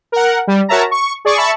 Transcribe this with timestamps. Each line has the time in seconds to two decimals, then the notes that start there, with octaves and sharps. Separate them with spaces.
0.12 A#4 F#5
0.47 G3
0.68 F#4 A#4 C#5 E5 A5 A#5
0.91 C#6
1.25 G#4 D5 C#6
1.38 E5 A5 B5 C#6